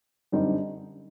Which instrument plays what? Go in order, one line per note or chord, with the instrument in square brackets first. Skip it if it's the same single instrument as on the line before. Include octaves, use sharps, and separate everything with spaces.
[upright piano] F#2 D3 G3 C4 D#4